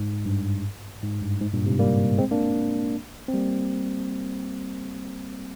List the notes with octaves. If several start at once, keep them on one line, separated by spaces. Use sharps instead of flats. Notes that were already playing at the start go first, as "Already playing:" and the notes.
Already playing: G#2
G2
G#2
G2
G#2
G2 A#2
G#2 C3
G3 A#3
G#3 C4
A#3 D4
C4
G3 A#3